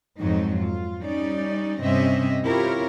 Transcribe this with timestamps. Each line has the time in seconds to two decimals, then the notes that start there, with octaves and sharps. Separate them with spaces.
0.19 F2 G#2 F#3 D#4
0.59 F4
1.03 G3 C#4 D#4 D5
1.81 G2 C3 C4 C#4 D#5 E5
2.43 C4 E4 F4 G4 A#4 C#5